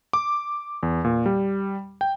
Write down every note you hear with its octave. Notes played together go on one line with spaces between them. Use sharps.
D6
E2
A#2
G3
G5